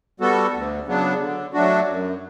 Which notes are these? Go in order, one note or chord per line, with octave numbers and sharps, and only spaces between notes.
G3 B3 F#4 A4
D2
C#3 F#3 B3 D4
D3
F#3 A3 D4 F#4
F#2